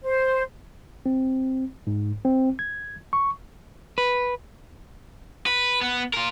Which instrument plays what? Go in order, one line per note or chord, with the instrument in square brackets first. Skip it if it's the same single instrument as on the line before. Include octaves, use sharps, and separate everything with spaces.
[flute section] C5
[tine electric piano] C4
G#2
C4
G#6
C#6
[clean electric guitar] B4
[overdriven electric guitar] B4
B3
F4 A#4